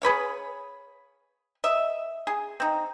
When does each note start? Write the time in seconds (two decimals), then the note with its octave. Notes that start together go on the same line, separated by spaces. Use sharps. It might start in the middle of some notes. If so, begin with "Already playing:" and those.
0.02 G#4 B4 C#5 F5
1.64 D#5 E5
2.27 G#4
2.60 C4 D#4